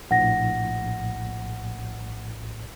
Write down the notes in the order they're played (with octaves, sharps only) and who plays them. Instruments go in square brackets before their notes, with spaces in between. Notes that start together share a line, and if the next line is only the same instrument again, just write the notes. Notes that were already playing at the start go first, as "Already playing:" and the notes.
[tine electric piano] A#1 A2 [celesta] F#5 A#6